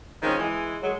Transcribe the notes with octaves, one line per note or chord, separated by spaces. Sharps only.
D#3 F3 G#3 C4 C#4
E3 G#3
F#3 G#3